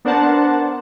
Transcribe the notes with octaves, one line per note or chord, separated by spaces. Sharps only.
B3 D4 A#4 C5 F#5 A5